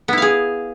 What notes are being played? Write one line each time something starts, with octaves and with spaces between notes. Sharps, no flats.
B3 E4 G#4 F5